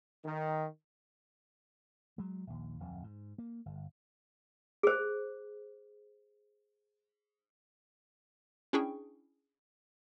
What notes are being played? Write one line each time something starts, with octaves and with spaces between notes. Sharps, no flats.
D#3
F#3 G#3
A#1 D#2
D1 F2
G#2
A#3
G1
G#4 C5
C#4 D4 E4 G#4 G5 C#6